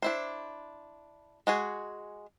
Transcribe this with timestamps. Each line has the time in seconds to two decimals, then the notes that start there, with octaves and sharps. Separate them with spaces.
0.02 D4 E4 C5
1.47 G#3 F#4 G#4